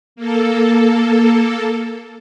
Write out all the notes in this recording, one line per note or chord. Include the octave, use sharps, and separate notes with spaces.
A#3 A4